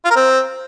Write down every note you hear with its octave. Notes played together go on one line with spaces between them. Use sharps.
F4
A#4
C4